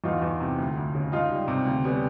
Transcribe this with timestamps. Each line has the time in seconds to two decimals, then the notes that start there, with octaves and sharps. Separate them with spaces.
0.04 E2 D#4 F4
0.22 E2
0.40 C3
0.58 D2
0.77 D2
0.95 C#3
1.12 C#2 D#4 F4
1.31 G3
1.48 C3
1.66 D2
1.84 G3 B3 C#4